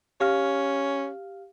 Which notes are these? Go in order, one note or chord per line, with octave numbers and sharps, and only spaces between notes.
C#4 G4 F5 F6